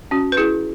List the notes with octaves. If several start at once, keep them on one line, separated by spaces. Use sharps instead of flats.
C#4 F#4
B4
E4 G#4